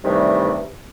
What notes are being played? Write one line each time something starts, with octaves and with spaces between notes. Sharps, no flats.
G2 C3 D#3 E3 G3 A3